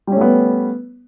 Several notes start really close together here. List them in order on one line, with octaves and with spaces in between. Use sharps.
G3 C#4 A3 B3